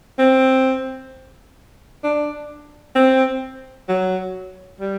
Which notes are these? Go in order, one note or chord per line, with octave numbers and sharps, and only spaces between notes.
C4
D4
C4
F#3
G3